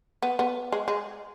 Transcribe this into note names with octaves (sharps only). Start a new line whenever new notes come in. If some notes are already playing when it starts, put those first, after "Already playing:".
B3
B3
G#3
G#3